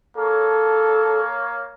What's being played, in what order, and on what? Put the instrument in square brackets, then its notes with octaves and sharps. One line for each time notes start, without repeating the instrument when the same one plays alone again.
[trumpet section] A#3 C#5 [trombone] A4